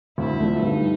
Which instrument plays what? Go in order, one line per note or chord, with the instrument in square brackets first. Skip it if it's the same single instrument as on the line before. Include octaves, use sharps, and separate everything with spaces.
[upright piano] D2 [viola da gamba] E4
[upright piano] D3 F3 A3
[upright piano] G2 [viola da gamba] D#4